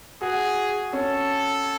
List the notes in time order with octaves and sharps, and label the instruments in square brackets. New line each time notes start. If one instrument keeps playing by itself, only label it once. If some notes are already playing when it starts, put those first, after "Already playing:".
[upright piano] F#4 [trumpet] G#4
[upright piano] C#4 [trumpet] A4